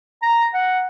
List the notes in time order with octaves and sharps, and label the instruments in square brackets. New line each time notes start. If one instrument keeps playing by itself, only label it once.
[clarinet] A#5
F#5